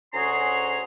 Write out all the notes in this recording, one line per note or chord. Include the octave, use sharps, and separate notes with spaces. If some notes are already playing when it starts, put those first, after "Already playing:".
D2 C#4 F#4 G#4 A#5 C6